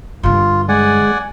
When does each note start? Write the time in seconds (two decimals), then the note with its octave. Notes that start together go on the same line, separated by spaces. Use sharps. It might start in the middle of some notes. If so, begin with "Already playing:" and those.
0.23 G2 D3 F4
0.69 G#3 D5 F#5 G#5